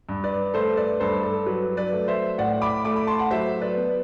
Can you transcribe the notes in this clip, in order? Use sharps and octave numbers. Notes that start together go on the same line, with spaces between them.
G2
B4 D5
A3 A4 C5
B4 D5
G2 A4 C5
A4
F#3 B4
B4 D5
A3
C5 E5
A2 D5 F#5
B5 D6
A3 B5 D6
B5
A5 C6
F#5
F#3 C5 E5
B4 D5
B3